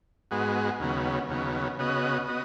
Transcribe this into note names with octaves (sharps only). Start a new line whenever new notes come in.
G#2 G#3 B3 F#4
D#2 C#3 F#3 B3
D#2 C#3 F#3 B3
C#3 B3 F#4 D#5
B3 F#4 D#5